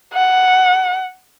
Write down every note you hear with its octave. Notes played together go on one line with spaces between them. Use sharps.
F#5